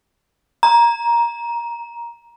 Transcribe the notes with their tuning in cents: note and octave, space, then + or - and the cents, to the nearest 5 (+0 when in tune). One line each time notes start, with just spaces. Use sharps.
A#5 +15